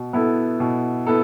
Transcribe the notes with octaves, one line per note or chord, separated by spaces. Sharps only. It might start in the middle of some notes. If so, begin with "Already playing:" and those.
Already playing: B2
B3 E4 A4
B2
B3 E4 A4